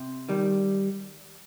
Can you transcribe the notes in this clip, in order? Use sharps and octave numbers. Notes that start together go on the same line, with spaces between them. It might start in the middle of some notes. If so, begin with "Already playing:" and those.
Already playing: C3
D#3 G3